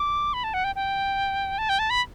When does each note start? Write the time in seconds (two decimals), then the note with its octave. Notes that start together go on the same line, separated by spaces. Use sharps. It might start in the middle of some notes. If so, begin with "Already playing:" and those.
Already playing: D6
0.33 B5
0.44 A5
0.54 F#5
0.64 G5
0.75 G5
1.58 A5
1.69 G5
1.79 A5
1.90 B5